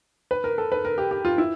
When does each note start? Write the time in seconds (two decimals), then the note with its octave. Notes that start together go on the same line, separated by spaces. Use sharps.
0.31 B4
0.44 A#4
0.58 A4
0.72 B4
0.85 A#4
0.98 G4
1.11 G4
1.25 F4
1.38 E4